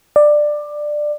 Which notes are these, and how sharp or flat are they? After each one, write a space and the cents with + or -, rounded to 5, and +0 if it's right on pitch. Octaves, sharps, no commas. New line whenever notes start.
D5 +15